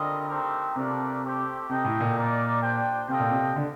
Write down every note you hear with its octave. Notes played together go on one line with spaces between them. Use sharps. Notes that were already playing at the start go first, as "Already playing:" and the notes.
Already playing: D3 G3 C4 F4 A#4 D#5
A3 C4 D#4 G4 A#4
C3 A3 D4 F4 A#4 D5
A3 C4 G4 C5
C3 D#4 A4 D#5 G5
A2
A#2
D#4 A#4 D5
D4 G4 C5 G5
C3 F4 A4 D#5 G5
A#2
C3
D3